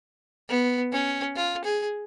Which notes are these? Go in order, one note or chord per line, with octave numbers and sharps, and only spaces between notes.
B3
C#4
F4
G#4